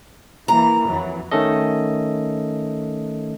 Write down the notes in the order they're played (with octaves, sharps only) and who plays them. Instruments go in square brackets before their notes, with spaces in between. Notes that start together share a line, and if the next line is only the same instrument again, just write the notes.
[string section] E3 A#3 [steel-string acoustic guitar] A#5
[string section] F2 E3 F#3
[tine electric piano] D#3 A3 C#4 A4 D#5